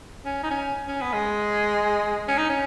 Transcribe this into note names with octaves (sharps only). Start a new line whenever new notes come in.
C#4
D#4
C#4
C#4
B3
G#3
C#4
D#4
C#4